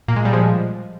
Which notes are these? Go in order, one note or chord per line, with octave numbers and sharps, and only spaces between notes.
A#2 A#3
G#3
G3
F3 G#3